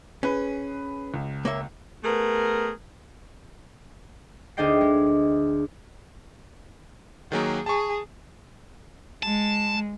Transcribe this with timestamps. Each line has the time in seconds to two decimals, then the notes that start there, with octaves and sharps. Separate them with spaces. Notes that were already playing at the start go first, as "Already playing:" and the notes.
0.23 C#4 G#4 B4
1.14 C#2
1.45 A#3 C#5 E5
2.04 A3 B3 G#4 A#4
4.57 D2 D4 G#4 D#5 G5 C7
4.81 G#3
7.32 D#3 F#3 A#3 G#4
7.66 G#4 A5 C#6
9.23 G#3 A5